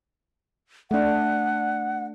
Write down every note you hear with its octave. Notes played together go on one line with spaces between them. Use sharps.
A3 D4 F#5